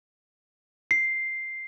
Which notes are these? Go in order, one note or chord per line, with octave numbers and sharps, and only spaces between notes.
C7